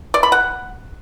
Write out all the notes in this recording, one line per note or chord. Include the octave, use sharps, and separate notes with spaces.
D5
B5
F#5